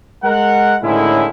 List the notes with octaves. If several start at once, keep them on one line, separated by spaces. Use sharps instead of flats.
G#3 A#4 F#5
A2 D3 D#3 G#3 C#4 E4